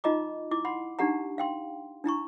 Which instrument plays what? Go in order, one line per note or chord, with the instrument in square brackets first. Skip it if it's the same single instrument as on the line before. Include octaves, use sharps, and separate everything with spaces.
[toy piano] D#4 F4 D#5 A#5 D6
E4 D6
F#5 B5 C6
D4 D#4 G4 F#5 A#5
F5 G5 C6
D4 E4 A#5 C#6